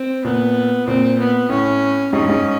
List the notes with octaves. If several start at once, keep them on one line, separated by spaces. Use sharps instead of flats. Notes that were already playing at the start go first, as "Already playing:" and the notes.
Already playing: C4
A#2 B3
A#2 C4
B3
A2 C#4
G#2 C#4
G2
G#2